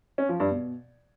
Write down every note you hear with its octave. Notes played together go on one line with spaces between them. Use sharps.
C#4
F3
G2
B2